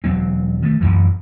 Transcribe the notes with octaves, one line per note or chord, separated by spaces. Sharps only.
E1 F#3 C4
D#3 A3
A1 F#2 A#2 E3